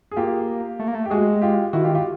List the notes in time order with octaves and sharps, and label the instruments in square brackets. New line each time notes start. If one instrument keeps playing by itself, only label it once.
[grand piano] G#4
[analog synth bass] A#3 [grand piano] F4 G4
[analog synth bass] A3
A#3
A3
[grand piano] G4
[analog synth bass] G#3 [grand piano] F#4 G#4
[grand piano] F4 G4
[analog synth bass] D#3 [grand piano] E4 F#4
[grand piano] F4 G4
F4 G4